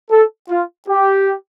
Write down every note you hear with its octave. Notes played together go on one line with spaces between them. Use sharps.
A4
F4
G4